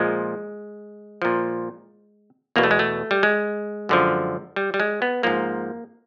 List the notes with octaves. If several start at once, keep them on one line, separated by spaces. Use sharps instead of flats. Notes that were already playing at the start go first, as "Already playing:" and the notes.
Already playing: A#2 F3 G#3
A#2 F3
E2 B2 A#3
A3
G#3
A3
G3
G#3
F#2 D3 F3
G3
G3
G#3
B3
G#2 F3 A#3